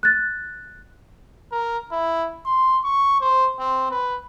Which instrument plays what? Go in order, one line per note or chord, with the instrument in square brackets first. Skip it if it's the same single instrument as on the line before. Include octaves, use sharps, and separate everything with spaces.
[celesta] F#6 A6
[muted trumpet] A#4
E4
C6
C#6
C5
C4
B4